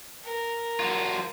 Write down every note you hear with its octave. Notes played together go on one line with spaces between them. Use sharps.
A#4
F#3 F4